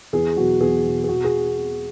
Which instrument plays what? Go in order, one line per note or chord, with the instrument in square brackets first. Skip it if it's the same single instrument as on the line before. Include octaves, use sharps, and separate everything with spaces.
[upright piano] E2 G#4
B2 F#3 F#4
E2 G#4
B2 F#3
G#4
B2 F#4
G#4